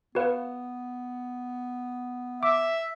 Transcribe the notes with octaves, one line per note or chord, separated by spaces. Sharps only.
B3 F#4 B4 F5
E5 D6